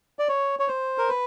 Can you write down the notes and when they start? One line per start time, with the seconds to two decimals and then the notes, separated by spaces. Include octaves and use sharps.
0.19 D5
0.29 C#5
0.59 C#5
0.68 C5
0.98 A#4
1.09 B4